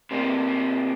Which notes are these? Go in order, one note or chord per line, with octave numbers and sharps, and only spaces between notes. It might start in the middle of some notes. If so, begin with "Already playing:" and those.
C3 A#3